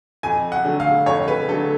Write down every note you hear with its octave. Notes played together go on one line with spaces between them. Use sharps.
F2 G#5
F#5
D3 F#3 A3
F5
F2 C#5
B4
D3 F#3 A3 A4